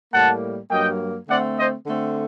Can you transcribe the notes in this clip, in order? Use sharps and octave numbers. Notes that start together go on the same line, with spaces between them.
A2 G3 A#3 F#5 A5
G2 F#3 A#3 D#5 G5
D3 A3 C4 D5 F#5
C5 D#5
D3 A3 C4